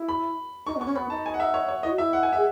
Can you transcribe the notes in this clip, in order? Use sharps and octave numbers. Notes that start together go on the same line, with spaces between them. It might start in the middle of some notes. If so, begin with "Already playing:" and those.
Already playing: E4
B5
D#4 C#6
B3
C#6
C#4
B3 B5
D#4 A5
G#5
F#5
E5
C#5
C#5
E4 D#5
F#4
E4 E5
F#5
G#5
E5
G#4